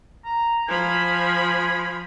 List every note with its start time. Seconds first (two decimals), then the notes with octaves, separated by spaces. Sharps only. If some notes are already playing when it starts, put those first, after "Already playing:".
0.25 A#5
0.68 F3 G#5 B5